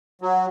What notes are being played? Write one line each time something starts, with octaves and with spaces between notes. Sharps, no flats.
F#3